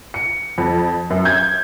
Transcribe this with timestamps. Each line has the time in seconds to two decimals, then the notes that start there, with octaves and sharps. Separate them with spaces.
0.14 C#7
0.58 F2
1.10 F#2
1.25 G6 G#6